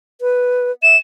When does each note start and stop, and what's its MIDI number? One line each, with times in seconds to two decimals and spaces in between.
0.21 0.71 71
0.83 0.96 76
0.83 0.97 100